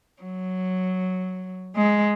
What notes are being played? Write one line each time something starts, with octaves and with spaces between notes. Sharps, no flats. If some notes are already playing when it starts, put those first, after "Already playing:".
F#3
G#3